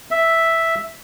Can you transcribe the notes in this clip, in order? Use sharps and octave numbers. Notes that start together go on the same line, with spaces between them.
E5